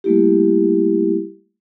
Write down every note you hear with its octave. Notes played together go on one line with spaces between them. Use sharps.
G3 A3 A#3 E4 G4